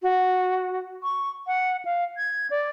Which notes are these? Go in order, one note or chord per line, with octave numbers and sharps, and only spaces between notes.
F#4
C#6
F#5
F5
G#6
D5